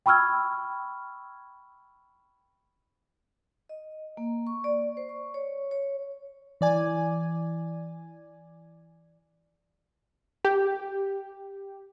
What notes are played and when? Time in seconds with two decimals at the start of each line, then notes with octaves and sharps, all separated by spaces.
0.06 G5 B5 C#6 E6 F6 G#6
3.69 D#5
4.17 A#3
4.47 C#6
4.64 D5
4.97 C5
5.09 C#6
5.34 C#5
5.71 C#5
6.61 E3 D5 G#5
10.45 G4